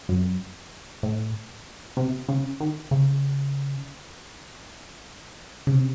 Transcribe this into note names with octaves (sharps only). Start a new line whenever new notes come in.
F#2
A2
C3
C#3
D#3
C#3
C#3
C3